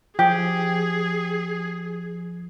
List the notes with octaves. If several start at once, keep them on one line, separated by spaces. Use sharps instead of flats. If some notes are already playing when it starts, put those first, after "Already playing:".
F3 G4 G#4 G#5